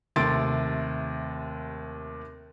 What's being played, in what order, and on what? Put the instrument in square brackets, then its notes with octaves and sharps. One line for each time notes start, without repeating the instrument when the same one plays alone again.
[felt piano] D#2 C3 A3 C6 A6 D7